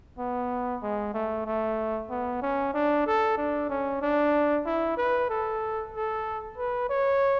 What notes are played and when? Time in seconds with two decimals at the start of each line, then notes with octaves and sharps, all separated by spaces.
0.18 B3
0.82 G#3
1.14 A3
1.46 A3
2.10 B3
2.42 C#4
2.74 D4
3.06 A4
3.37 D4
3.69 C#4
4.02 D4
4.65 E4
4.97 B4
5.29 A4
5.94 A4
6.57 B4
6.89 C#5